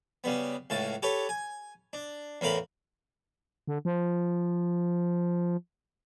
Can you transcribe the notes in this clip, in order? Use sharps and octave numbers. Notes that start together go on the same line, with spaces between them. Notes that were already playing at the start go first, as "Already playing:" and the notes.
C#3 G3 B3
C#2 A2 C#3 A5
G4 A4 B4 C#5
G#5
D4
E2 A2 A#4 F5 B5
D3
F3